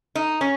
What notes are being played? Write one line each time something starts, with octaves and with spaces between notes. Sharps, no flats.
D#4
C#4